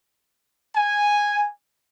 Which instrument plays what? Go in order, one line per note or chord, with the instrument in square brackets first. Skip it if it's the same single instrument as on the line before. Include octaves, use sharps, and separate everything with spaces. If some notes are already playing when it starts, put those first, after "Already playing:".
[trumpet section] G#5